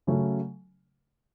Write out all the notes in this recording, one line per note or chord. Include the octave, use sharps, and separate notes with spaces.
C#3 F#3 A3 C#4